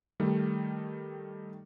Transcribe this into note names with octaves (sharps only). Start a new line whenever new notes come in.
D#3 G3 A3